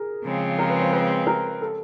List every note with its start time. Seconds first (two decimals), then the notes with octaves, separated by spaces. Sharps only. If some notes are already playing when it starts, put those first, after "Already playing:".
Already playing: G#4 A#4
0.23 C#3 F3 G#3 C4
0.59 A#4
0.69 B4
0.82 C5
0.92 B4
1.27 A#4
1.61 A4